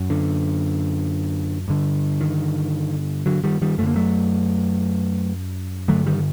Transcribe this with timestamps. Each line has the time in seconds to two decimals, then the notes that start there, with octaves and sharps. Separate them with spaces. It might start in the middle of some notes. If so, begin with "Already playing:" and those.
Already playing: F#2
0.10 D3
1.68 G2 D3
2.21 D#3
3.26 D3 F#3
3.44 D#3 G3
3.62 D#3 G3
3.78 F#2 A3
3.83 D3 A#3
3.96 F#3 A3
5.88 G2 D3 F#3 A3
6.06 D#3 G3